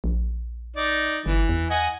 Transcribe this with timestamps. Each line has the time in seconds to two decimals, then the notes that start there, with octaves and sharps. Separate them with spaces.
0.04 A#1
0.76 D#4 D5
1.26 G1 E3
1.49 E2
1.70 D#5 F#5 G#5